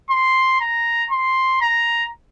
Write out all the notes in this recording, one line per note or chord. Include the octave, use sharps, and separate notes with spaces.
C6
A#5
C6
A#5